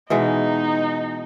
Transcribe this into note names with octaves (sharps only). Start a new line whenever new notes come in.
B2 E3 G#3 D#4